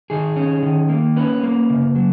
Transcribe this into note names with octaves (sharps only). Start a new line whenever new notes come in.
D#3 G#4
C#4
D#3
A#3
C#4 B4
A#3
C#3
F#3